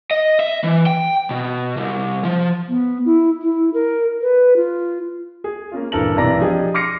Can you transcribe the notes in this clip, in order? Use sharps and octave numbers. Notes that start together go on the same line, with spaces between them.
D#5
E5
E3
G5
B2
C2
F3
B3
E4
E4
A#4
B4
F4
G#4
A#3 C#4 F4
D#1 G2 E3 A4 A#4 F#7
B1 C3 E3 D5 A#5 A#6
F3 D4 G4 G#4 D#5
C6 D6 F6 A#6 C7 C#7